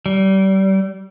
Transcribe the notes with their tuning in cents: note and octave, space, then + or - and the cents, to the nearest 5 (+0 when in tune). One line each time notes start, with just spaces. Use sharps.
G3 -30